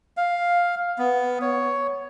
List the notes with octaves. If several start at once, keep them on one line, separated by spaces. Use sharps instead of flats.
F5
B3
C#5